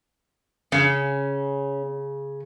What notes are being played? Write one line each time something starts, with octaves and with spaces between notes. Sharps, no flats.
C#3 C#4